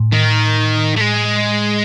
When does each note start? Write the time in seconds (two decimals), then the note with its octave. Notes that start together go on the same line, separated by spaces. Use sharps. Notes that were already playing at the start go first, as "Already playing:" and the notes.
Already playing: A2
0.12 D#3
0.97 A3
1.01 G#3